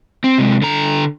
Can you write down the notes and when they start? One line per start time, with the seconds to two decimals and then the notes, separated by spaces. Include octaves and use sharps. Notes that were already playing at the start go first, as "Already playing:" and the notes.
0.24 C4
0.38 C3 G#3
0.62 D3 A#5